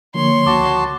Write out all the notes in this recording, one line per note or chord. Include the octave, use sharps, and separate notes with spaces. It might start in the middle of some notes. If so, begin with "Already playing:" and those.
D3 F3 A#3 C#5 C6
C#2 F#4 A5 D6